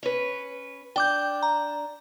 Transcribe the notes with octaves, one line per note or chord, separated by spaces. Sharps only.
C#4 B4
D4 G5 D6 G6
A#5